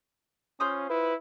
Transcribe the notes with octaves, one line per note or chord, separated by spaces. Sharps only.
C#4 F4 C5 D#6
E4 B4